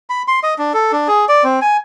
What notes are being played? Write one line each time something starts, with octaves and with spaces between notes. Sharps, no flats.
B5
C6
D#5
D4
A4
D4
G#4
D5
C4
G#5